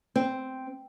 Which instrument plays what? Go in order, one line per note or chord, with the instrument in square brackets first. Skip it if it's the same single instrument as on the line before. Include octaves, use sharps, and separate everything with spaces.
[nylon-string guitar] C4